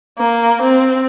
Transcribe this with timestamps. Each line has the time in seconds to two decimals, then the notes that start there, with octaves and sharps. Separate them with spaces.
0.18 A#3
0.61 C4